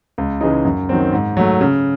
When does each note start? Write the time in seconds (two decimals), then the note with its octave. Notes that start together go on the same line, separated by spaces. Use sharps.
0.18 C#2
0.41 C#3 E3 G#3 D#4
0.65 F#2
0.89 D#3 F#3 C4
1.12 G#2
1.37 F#3 A3
1.61 C#3